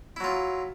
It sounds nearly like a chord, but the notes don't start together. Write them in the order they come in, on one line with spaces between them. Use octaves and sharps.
E4 F#3 F4